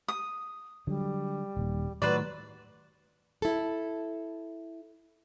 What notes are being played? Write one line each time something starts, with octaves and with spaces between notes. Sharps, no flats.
D#6
D3 F#3 G3
D#1 D#2
A2 D#3 F#3 A3 B4 C5 D5
E4 A4